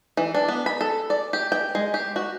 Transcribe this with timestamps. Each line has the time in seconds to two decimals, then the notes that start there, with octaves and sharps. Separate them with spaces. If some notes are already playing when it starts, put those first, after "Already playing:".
0.17 E3
0.35 D4
0.48 B3
0.66 B5
0.81 A4
1.10 D5
1.33 G4
1.52 G5
1.75 G#3
1.94 G4
2.16 F#4